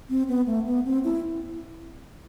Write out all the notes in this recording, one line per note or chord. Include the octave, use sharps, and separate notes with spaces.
C4
B3
A3
B3
C4
E4